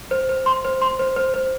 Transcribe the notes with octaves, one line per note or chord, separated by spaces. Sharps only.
C5
C5
C6
C5
C6
C5
C5
C5